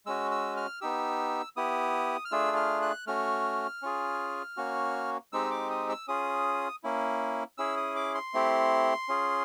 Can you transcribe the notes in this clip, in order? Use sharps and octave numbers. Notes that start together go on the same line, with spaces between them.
G#3 C#4 F#4 E6
E6
F6
B3 D#4 G4 E6
B3 E4 G4 D#6
F6
A3 D4 F4 G#4 E6
F6
F#6
A3 C#4 F#4 F6
C#4 F4 G#4
A#3 C#4 F#4
G#3 C4 D#4 G4 E6
D6
D#6
E6
C#4 F4 G#4 D#6
A#3 C#4 E4
C#4 E4 G#4 E6
D#6
D6
C6
A3 C4 E4 G4
C#4 F4 G#4